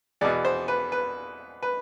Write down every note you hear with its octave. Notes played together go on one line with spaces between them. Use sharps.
E2 B2 D5
C5
B4
B4
B4